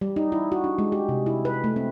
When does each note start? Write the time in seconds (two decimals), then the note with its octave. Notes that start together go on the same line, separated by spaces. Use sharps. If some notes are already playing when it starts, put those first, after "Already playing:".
0.01 G3
0.16 D#4
0.32 E4
0.52 F#4
0.64 D4
0.78 G#3
0.92 G4
1.09 C3
1.26 E4
1.45 B4
1.64 A3
1.76 C4